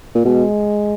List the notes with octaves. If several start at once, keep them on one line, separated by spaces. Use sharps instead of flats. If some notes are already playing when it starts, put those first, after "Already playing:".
A#2
B2 G#3